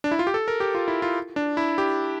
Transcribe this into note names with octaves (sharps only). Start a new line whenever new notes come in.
D4
E4
F4
G4
A4
A#4
G4
F4
E4
F4
D4
E4
G4